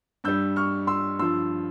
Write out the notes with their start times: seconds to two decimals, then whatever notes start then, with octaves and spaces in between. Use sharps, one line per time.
0.24 G2 G3 E6 G6
0.56 C#6 F6
0.87 C6 E6
1.19 G2 F3 C6 E6